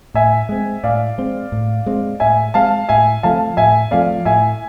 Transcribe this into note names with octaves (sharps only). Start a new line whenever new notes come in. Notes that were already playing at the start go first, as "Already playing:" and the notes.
A2 E5 G#5
G#3 C4
A2 D5 F5
G#3 C4
A2
G#3 C4
A2 E5 G#5
G#3 C4 F5 A5
A2 E5 G#5
F3 A3 C4 F5 A5
A2 E5 G#5
F3 A3 C4 D5 F5
A2 E5 G#5